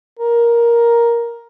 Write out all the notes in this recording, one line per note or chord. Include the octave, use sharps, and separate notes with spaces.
A#4